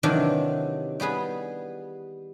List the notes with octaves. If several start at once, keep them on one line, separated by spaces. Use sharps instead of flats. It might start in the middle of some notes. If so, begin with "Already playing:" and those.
C3 D#3 E3 F#3 D4
G3 B3 G#4 B4